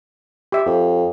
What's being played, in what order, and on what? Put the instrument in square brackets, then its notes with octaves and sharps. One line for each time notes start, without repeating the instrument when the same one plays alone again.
[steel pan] G4 E5
[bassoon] F2